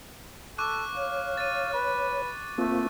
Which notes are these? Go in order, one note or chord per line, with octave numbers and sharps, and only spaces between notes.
A4 C#6 D6 F#6
C#5 F5
A6 D#7
B4
A3 A#3 C4 F4